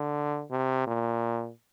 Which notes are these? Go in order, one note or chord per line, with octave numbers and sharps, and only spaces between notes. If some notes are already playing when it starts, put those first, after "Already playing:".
Already playing: D3
C3
A#2